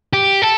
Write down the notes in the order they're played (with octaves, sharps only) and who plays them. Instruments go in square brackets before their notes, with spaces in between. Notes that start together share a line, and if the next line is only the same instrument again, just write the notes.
[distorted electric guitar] G4
A4